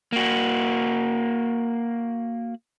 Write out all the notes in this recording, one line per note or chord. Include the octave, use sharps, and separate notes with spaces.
A#3 F#4